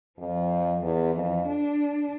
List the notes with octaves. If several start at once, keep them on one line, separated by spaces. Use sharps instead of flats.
F2 F3
E2 E3
F2
D4